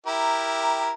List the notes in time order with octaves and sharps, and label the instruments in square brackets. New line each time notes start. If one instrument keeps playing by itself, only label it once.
[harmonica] E4 G4 A#4 [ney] A#5